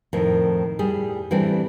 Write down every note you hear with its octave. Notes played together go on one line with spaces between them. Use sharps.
F2 A2 D#3
A2 G3 G#4
E3 G3 A3 C4 D4